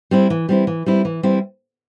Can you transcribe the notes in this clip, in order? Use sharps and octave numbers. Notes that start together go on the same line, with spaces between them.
G3 C4 E4
E3
G3 C4 E4
E3
G3 C4 E4
E3
G3 C4 E4